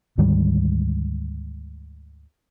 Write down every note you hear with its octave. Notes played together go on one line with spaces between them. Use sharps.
D2 G#2 D#3 G3